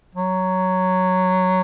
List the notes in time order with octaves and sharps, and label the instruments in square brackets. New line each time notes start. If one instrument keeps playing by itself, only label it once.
[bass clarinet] F#3